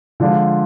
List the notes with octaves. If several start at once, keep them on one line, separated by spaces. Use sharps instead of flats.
D3 F3 G#3 D4 F4